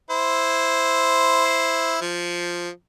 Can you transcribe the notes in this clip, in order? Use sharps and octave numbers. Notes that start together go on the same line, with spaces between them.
E4 C5
F3